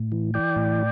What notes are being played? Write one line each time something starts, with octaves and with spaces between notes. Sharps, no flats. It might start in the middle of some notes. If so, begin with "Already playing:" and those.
Already playing: A2
E3
E3 D5 G5
A2